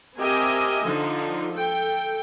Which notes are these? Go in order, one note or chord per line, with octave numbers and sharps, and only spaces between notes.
C4 G4 A#4 D#5 E5 G#5
D3 F3 D#4
A4 G5